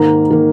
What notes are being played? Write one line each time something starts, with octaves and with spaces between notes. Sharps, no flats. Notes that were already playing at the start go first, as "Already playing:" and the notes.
Already playing: G#2 D#3 A#3 A#5
D#3 A#3